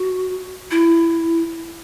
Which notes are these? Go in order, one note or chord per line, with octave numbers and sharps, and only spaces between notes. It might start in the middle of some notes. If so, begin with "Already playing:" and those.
Already playing: F#4
E4